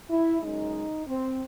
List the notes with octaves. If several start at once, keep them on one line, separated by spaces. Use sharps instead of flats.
E4
F#2 C#3 G#3 D#4
C4